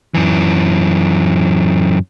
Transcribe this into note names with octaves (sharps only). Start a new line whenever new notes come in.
F#2 E3